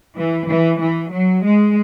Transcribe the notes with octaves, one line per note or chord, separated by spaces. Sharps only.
E3
E3
E3
F#3
G#3